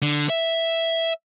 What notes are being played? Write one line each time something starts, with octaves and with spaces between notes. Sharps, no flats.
D3
E5